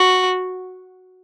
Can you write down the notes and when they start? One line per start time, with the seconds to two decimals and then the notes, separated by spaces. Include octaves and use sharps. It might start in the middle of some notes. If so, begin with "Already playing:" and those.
Already playing: F#4